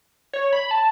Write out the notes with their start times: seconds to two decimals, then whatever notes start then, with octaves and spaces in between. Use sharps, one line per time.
0.33 C#5
0.53 B5
0.71 A5